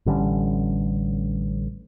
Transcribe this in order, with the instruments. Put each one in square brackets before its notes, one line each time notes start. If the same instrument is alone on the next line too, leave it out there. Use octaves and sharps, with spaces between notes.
[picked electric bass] A1 D3 G3 C#4